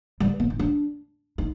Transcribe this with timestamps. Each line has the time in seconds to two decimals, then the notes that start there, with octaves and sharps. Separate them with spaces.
0.20 G3
0.40 B3
0.50 D#4
0.59 D4
1.38 D#4